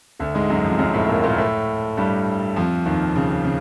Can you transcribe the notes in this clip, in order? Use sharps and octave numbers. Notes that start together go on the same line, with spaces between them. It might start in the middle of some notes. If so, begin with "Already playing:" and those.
D2 D3
G#2 G#3
F#2 F#3
F2 F3
F#2 F#3
A2 A3
A#2 A#3
A#2 A#3
A2 A3
G2 G3
F2 F3
D#2 D#3
C#3
C#3